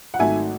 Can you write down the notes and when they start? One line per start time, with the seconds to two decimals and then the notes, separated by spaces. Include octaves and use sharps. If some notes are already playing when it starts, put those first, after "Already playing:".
0.14 F#5
0.19 G#1 G#2 F#3 A3 E5 G#5